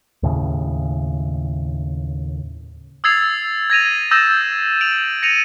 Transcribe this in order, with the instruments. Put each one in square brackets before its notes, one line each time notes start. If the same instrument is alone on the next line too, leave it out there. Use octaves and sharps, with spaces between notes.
[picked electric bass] D#2 A2 C#3
[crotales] D#6 E6 G#6 A6 C7 F7
G#6 A#6 D#7 F7
D#6 E6 G6 A6 A#6 E7
D7 F7 F#7
A#6 C#7 D#7 F7